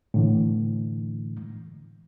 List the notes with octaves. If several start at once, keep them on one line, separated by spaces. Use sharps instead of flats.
A2 D3 E3